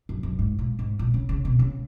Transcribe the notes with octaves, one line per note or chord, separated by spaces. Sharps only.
F#2
F#2
G#2
A#2
G#2
A#2
C#3
C#3
B2
C#3